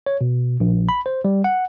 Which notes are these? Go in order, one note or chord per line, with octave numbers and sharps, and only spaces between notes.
C#5
B2
A#1
B5
C5
G3
F#5